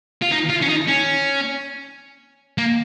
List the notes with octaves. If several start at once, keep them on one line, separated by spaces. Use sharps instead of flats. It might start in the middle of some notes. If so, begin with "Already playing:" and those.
F4
D#4
F4
C#4
D#4
C#4
A#3